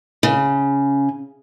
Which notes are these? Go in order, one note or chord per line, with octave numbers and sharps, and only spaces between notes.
C#3